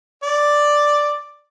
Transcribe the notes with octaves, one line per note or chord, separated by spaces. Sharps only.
D5